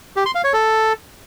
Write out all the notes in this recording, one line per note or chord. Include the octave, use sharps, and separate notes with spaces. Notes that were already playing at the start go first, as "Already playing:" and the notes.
G4
C6
F5
C#5
A4